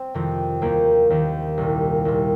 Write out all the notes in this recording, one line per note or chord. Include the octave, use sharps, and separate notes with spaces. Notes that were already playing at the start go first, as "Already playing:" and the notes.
Already playing: C4
F2 C3 D#3
D#2 D#3 A#3
D#2 D#3
C2 A#2
C2 A#2